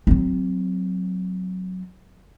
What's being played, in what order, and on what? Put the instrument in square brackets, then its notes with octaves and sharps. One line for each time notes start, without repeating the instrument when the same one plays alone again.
[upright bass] F#3 C4